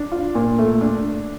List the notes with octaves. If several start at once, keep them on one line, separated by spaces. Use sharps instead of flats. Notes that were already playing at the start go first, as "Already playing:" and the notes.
Already playing: D4
F4
A#2
A3
D4